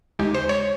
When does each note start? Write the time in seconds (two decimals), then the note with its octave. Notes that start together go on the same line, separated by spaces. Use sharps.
0.19 D#2 C#3 G#3 D#4 G4
0.34 C5
0.49 C#5